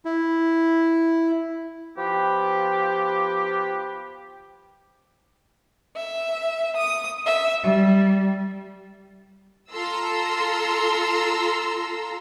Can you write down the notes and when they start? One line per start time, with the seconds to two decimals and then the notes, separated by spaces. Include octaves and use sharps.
0.05 E4
1.98 F3 B3 G4
5.95 E5
6.76 D#6
7.26 E5
7.64 G3
9.72 F4 A4 A#5 C6 E6